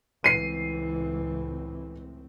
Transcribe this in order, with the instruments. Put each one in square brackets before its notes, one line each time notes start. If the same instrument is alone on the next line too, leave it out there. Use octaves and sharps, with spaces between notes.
[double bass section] C#2 A2 C4 [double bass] E3 [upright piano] C7 D#7